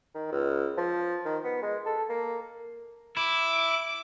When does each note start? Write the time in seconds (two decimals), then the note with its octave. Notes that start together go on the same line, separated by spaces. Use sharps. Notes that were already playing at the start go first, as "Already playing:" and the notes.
0.15 D#3
0.32 C#2
0.77 F3
1.25 D#3
1.44 B3
1.62 G#3
1.86 A4
2.10 A#3
3.17 E4 D6